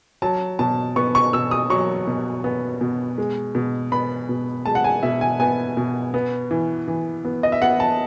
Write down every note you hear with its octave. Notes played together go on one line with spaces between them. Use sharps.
F#3 A5
B2 A5
B3 C#6
C#6
B2 E6
D#6
F#3 C#6
B2
B3
B2
G#3
B2
B3 B5
B2
G#3 A5
F#5
G#5
B2 E5
G#5
B3 G#5
B2
B3
E3
E3
B3
D#5
E5
B3 F#5
A5